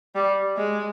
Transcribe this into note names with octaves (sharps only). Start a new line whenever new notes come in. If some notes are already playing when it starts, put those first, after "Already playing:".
G3
G#3